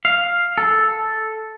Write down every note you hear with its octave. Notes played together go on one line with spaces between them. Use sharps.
F5
A4